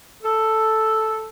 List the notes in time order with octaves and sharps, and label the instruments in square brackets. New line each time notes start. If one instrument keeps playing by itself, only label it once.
[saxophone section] A4